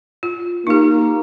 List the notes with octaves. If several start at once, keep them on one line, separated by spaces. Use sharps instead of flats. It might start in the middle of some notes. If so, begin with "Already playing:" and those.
F4
A#3 D#4 G4